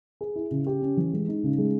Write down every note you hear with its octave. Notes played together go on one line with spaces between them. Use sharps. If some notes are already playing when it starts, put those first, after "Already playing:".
G#4
E4
C#3
G4
C#4
E3
G#3
D#4
C#3
G#3